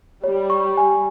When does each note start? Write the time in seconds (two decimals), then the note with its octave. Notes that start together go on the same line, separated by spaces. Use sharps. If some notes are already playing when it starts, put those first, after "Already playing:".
0.24 G3 C#5
0.50 C#6
0.77 G#5